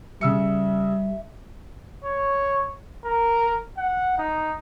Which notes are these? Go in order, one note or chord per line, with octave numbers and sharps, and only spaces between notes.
C#3 G3 E5 E6 C#7
C#5
A#4
F#5
D#4